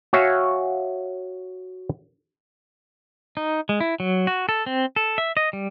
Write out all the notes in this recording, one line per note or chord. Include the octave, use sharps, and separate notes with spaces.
F#4 C#5 E5 F5 G#5
D#4
G#3
E4
F#3
F#4
A4
C4
A4
E5
D#5
G3